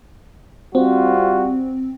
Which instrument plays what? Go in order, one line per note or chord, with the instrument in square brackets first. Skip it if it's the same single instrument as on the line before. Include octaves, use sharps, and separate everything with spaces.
[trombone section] G3 F4 F#4 [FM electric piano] C4